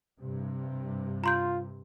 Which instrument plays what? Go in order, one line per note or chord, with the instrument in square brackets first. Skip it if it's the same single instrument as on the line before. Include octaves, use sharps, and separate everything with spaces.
[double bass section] G2 C3
[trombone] F4 [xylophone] A#5 C6 G6